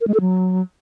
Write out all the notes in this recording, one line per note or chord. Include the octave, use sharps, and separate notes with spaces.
A#4
G#3
A4
F#3